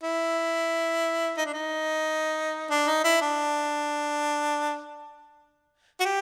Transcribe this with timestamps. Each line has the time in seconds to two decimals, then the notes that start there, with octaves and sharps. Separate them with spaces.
0.03 E4
1.37 D#4
1.45 D4
1.53 D#4
2.70 D4
2.87 D#4
3.04 E4
3.21 D4
6.00 F#4
6.05 G4